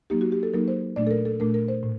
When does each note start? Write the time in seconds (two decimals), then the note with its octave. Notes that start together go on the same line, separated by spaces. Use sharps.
0.10 F#3 A#3 D#4 G4
0.21 F#4
0.32 G4
0.43 A4
0.53 F#3 A#3 D#4 A#4
0.68 C5
0.96 A#2 A3 D4 D5
1.07 A4
1.11 A#4
1.25 A4
1.40 A#2 A3 D4 A#4
1.54 A#4
1.68 C5
1.83 A2